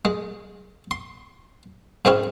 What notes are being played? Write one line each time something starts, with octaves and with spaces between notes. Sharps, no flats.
G#3
C6
G#2 G#3 C4 C#4 E4